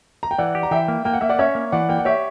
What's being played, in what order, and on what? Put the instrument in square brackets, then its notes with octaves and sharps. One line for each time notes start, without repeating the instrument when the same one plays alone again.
[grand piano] A#5
G5
[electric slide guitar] E3 [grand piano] D5 F#5
[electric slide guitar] G4
[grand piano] A#5
[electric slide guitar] E3 [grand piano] E5 G5
[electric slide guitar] A#3
[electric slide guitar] A#3 [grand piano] G5
[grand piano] F#5
[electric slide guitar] A#3 [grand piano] E5
[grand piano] D5 F#5
[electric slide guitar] C#4 [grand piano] C#5 E5
[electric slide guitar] A#3
[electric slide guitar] E3 [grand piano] D5 F#5
[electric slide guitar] A#3 [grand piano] G5
[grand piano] F#5
[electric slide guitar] G4 [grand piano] C#5 E5